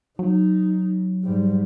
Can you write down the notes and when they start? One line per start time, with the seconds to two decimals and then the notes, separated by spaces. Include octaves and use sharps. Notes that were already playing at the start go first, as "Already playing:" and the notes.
0.19 F#3 D#4
1.24 G#2 G3